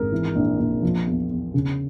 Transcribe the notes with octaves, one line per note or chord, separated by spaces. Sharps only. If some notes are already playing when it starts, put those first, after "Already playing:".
Already playing: G#1 G#4 A#4
E3
A#1
A#1
F3
E2
E2
C#3